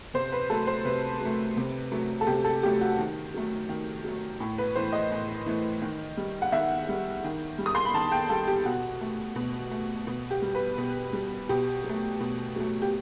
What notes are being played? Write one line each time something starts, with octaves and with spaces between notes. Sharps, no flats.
C3 C5
B4
F#3 A3 A4
C5
C3 B4
F#3 A3
C3
F#3 A3
A4
C3 G4
A4
F#3 A3 G4
F#4
D#3
F#3 A3
D#3
F#3 A3
A2
B4
E3 A3 C5
D#5
A2
E3 A3
D#3
G3
F#5
D#3 E5
G3
D#3
G3
D#6
C6
B5
D#3 A5
G5
G3 A4
G4
B2 F#4
A3
B2
A3
B2
G4
G3
B4
B2
G3
B2 G4
F#3
A3
B2
F#3 A3
G4